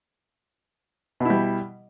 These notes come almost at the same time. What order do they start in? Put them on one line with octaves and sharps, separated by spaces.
B2 E4 G3